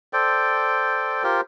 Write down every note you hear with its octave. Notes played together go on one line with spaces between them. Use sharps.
A4 C5 D5 G5
F4 G4 A#4 C5